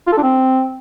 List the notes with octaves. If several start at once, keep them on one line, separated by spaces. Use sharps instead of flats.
F4
A4
D4
C4